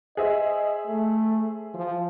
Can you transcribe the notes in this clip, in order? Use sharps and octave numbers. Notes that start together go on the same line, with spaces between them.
G#4 C5 D#5 E5
A3
F3